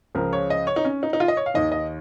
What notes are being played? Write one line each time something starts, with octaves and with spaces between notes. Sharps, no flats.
C#2 C#3 F3 A#4
C#5
D#5
C#5
D#4
C#4
D#4
D#4
F4
D#5
C#5
F5
D#2 D#3 D#5
D#5